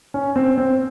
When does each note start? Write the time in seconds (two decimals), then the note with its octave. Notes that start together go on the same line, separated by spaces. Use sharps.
0.14 C#4
0.36 C4
0.58 C4